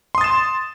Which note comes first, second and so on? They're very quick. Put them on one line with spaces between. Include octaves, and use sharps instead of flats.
C6 D#6 A6 E7